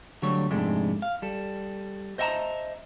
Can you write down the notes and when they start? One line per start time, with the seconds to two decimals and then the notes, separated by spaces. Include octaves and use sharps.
0.22 D3 F#3 G3 A3 C#5
0.51 F2 G#2 C3 G#3 A3 D4
1.02 F5
1.22 G3 A4
2.18 C5 D#5 E5 F#5 A5 A#5